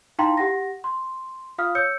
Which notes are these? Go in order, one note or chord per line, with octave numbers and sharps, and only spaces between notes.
D#4 E4 F5 G5 A#5 C6
G4 F#5 A#6
C6
F4 F5 D#6 F6
C#5 E6 G6 C#7